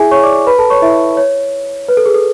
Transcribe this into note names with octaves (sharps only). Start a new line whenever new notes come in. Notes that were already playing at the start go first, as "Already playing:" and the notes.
Already playing: E4 G#4 E5 G#5
C#5 C#6
D5 D6
B4 B5
A4 A5
C#5 C#6
E4 E5
C#5
B4
A4
G#4
A4